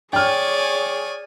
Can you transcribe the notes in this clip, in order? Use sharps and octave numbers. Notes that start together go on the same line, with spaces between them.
G#4 C#5 D5 G5 G#5 F6